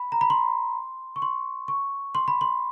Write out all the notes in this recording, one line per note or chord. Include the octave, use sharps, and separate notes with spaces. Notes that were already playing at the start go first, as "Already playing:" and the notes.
Already playing: B5
A#5
B5
C6
C#6
C6
C#6
C6
B5
C6